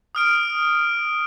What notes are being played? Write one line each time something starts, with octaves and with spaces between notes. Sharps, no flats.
D#6 F6 D7